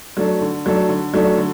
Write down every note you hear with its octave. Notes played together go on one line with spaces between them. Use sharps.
F#3 A3 D4 A4
D3
F#3 A3 D4 A4
D3
F#3 A3 D4 A4
D3